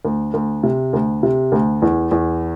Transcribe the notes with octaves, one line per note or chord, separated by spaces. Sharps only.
D2
D2
C3
D2
C3
D2
E2
E2